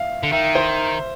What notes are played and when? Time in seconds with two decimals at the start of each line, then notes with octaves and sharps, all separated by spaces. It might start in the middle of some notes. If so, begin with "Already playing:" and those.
Already playing: E5 F5
0.23 D3
0.32 D#3 E5
0.55 C5